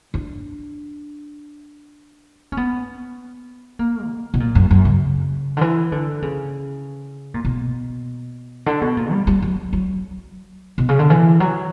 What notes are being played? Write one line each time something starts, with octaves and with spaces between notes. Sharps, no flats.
D4
C#4
B3
A#3
B2
B2
A#2
F#2
F#2
C#3
D3
E3
D3
C#3
A#2
B2
D3
B2
A#2
G3
G3
F#3
F#3
B2
C#3
D3
E3
F#3